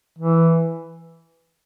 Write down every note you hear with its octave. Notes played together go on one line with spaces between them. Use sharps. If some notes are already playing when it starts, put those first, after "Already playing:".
E3